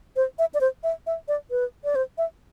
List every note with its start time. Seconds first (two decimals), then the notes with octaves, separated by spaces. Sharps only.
0.16 C5
0.39 E5
0.54 D5
0.61 C5
0.83 E5
1.07 E5
1.28 D5
1.51 B4
1.84 D5
1.95 C5
2.18 E5